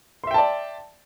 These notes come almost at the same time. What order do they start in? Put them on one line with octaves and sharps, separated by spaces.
C6 E5 G5 A5 D5